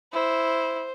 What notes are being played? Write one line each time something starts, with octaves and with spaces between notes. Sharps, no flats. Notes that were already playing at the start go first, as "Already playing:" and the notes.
E4 C5